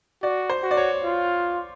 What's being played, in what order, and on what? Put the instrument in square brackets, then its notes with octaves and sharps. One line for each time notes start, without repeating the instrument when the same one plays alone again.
[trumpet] F#4 [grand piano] D5
[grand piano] C5
[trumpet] F#4
[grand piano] D5
C#5
[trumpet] F4